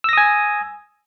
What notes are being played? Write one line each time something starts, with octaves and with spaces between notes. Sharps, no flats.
G#5 D#6 E6 A#6